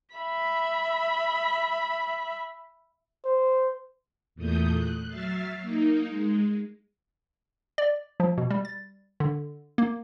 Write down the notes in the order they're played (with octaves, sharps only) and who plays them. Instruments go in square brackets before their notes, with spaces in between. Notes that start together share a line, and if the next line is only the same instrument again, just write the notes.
[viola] E5 B5
[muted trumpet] C5
[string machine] E2 A#2 A3 D#6 G6
F#6
F#3 E5 F6 A6 C7
A#3 D#4
G#3
[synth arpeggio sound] D5
F3
B2
G3
A6
D3
A#3